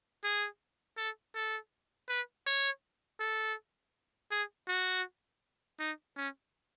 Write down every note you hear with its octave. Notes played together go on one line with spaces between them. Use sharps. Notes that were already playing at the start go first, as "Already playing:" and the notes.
G#4
A4
A4
B4
C#5
A4
G#4
F#4
D#4
C#4